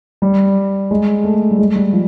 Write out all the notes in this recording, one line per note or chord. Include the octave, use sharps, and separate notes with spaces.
G3
G#3
A3
G3
G#3
G3
F3